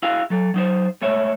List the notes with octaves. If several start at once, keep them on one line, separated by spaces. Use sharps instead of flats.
E4 F#4 G#4 F5
F#3 A4
F#3 D#4 C5
G#3 A3 C#5 E5